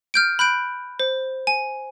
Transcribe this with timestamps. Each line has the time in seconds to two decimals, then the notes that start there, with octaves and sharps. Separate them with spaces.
0.14 F6 G6 D7
0.39 B5 F#6 G6 D7
1.00 C5
1.47 G#5